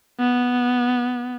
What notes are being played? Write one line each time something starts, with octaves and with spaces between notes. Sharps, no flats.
B3